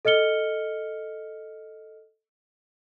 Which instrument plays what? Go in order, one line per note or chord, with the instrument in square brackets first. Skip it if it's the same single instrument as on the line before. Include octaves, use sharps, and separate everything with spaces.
[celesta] A4 D#5 F6 C#7 G7